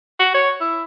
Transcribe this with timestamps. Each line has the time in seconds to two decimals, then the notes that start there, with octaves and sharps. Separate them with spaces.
0.20 F#4
0.34 C#5
0.61 E4